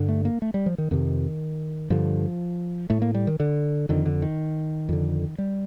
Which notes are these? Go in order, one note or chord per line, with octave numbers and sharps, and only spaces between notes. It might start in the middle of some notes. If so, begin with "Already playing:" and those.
Already playing: G2 D3
A3
A#3
A3
G3
F3
D#3
F2 C3 D#3
G2 D3 F3
A2 A3
A#3
G3
D#3
D3
F2 D3 D#3
D3
D#3
F2 D3
G3